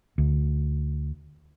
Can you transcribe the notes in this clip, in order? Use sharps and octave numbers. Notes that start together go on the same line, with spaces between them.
D2